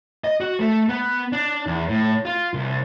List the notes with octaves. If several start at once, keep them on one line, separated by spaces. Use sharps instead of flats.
D#5
F#4
A3
B3
D4
E2
A2
F4
C2